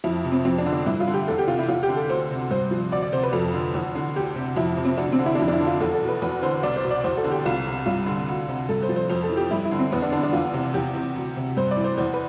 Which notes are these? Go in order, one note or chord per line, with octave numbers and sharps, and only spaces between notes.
F2 E4
C3
C4
F2 C4
D4
D3
D4
G2 E4
F4
D3
G4
E2 A4
G4
C3 F4
E4
E2 F4
G4
D3
A4
D2 C5
C3
G2 C5
F3
D2 D5
D5
C3 C5
B4
F2 A4
D3
E2
D3
D2 G4
C3
F2 E4
C3
C4
D2 D4
C4
D3
E4
D4
F2 E4
D4
E4
D3
F4
E2 A4
A4
B2
B4
E2 B4
D3 C5
C2 D5
C5
B2
D5
E2 C5
A4
D3
G4
C2 F4
C3
G2 F4
D3
D2
C3
G2 A4
C5
F3
C5
F2 C5
A4
E3
G4
G2 E4
E4
D3
C4
E2 B3
D4
D3 D4
D4
E2 F4
C3
E2 G4
C3
D2
C3
G2 C5
D5
E3
C5
E2 C5
B4